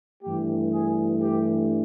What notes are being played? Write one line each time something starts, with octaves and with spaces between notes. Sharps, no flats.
G2 E3 A3 G4
G#4
G4